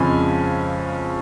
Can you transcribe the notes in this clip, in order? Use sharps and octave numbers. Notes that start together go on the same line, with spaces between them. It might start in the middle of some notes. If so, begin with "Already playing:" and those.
Already playing: F2 C#3 G#3 C#4 G#5 B5